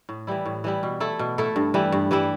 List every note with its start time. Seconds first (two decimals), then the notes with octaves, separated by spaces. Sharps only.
0.09 A2
0.27 E3 G3 E4
0.46 A2
0.64 E3 G3 E4
0.83 B2
1.00 A3 E4 A4
1.19 B2
1.38 A3 E4 A4
1.56 G2
1.74 E3 G3 E4
1.92 G2
2.11 E3 G3 E4